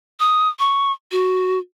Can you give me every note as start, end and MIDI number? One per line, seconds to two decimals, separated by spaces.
0.20 0.48 87
0.59 0.92 85
1.12 1.59 66